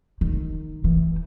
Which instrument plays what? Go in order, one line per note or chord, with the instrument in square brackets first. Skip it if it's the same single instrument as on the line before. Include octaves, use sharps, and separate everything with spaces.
[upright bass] D#3
E3